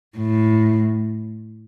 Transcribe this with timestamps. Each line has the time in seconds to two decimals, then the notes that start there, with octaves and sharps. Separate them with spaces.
0.17 A2